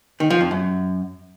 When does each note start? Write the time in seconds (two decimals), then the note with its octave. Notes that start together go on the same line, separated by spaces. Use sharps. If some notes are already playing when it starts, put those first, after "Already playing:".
0.20 D#3
0.30 F3
0.41 F2
0.51 F#2